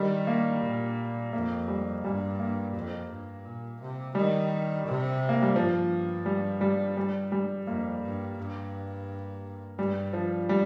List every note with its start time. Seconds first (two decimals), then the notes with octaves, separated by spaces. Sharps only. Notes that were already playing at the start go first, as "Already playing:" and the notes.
Already playing: D#3 G3
0.27 A#3
0.64 A#2
1.33 F2 A#3
1.68 G3
2.04 G2 G3
2.39 A#3
2.74 F2
3.10 G2
3.45 A#2
3.80 C3
4.15 D#3 G3
4.86 C3
5.29 A#3
5.42 G3
5.56 G2 F3
6.26 G3
6.61 G3
6.97 G3
7.32 G3
7.67 F2 A#3
8.03 G2
8.38 G2
9.78 G2 G3
10.13 F3
10.49 G3